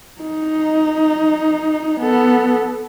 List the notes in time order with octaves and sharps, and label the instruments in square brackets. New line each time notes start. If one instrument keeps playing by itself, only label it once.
[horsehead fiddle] D#4
B3 A4